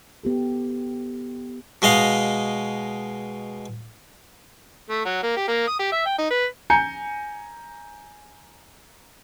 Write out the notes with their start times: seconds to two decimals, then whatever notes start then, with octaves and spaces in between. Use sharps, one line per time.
0.23 B3 G4 A4
1.82 B2 G#3 D#5 F5
4.90 A3
5.05 F#3
5.23 A#3
5.37 G4
5.48 A#3
5.67 D#6
5.79 G4
5.92 E5
6.06 G5
6.18 D#4
6.30 B4
6.70 G#5 A#5 G6 C#7